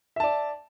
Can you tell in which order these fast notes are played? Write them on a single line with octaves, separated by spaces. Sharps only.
E5 A5 D5